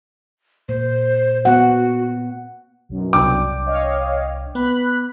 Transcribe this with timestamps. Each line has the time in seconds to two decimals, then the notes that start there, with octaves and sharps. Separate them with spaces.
0.69 A#2 A#3 C5
1.45 B3 F#4 F#5
2.89 B1 F#2
3.13 C2 D4 G5 D6
3.66 C#5 D#5 F5
4.55 B3 B5 F#6